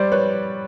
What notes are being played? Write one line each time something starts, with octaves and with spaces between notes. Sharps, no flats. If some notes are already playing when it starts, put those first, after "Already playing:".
Already playing: G3 C5 D5
B4 C#5